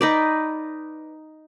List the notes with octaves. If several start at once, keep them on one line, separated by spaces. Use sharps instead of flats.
D#4 B4 D5